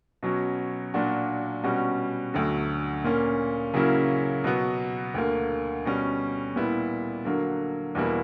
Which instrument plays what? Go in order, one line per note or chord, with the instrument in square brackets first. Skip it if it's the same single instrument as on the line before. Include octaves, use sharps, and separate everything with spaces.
[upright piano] B2 F#3 C#4
A#2 F#3 A#3 D4 F#4
B2 G3 C#4 F#4
D2 D3 F#3
A#2 A#3 C#4
C#3 F#3 A#3 C#4 E4
B2 F#3 B3
D2 D3 A#3
B2 G3 C#4
A#2 G3 B3 E4
D3 F#3 A#3
E2 B2 G3 A#3 E4